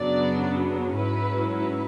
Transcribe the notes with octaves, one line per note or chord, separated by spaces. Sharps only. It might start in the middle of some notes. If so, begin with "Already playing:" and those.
Already playing: F#2 C#3 F#3 B3 D4 D5
G#2 F#3 C#4 E4 B4
B4